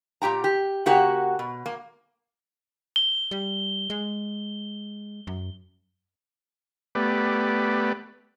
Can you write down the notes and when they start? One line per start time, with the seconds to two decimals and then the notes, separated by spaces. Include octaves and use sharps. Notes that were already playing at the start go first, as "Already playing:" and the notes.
0.22 A#2 G4 G5 A#5
0.44 G4
0.86 C#3 A#3 F#4 G4 F#5
1.39 B2
1.66 A#3
2.96 G7
3.31 G3
3.90 G#3
5.27 F#2
6.95 A3 B3 G4 B4 D5